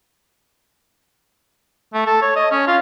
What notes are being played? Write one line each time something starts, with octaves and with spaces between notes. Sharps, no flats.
A3
A4
C#5
D#5
C#4
F4